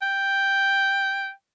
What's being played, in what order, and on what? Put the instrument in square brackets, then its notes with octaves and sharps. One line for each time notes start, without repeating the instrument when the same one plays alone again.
[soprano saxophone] G5